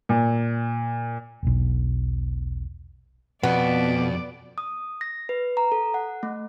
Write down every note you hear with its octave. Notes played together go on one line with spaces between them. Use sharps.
A#2
E1 B1
F2 B2 B3 D5
D#6
A#6
B4
A#5
A4
F#5
A3